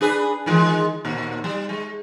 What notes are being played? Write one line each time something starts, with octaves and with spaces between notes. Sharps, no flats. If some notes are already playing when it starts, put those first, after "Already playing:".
D4 G#4 B4
D#3 E3 G#3
D#2 A#2
G3
G#3